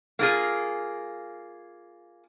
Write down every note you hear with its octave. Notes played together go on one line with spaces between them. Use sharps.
A#3 F4 G#4